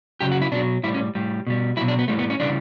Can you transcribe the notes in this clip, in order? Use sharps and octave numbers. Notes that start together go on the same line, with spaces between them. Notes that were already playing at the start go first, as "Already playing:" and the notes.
C#3 F#3 G4
F#4
E4
B2 F#3 D4
A2 G3 E4
C#4
A2 G3
B2 G3
B2 F#3 E4
D4
B3
A2 E3 G3 A3
B3
C#4
C#3 E3 G3 D4